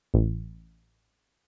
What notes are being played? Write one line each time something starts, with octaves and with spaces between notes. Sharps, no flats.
A1